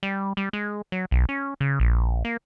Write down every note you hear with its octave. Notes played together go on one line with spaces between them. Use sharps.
G3
G3
G#3
F#3
B1
C#4
C#3
A#1
A#3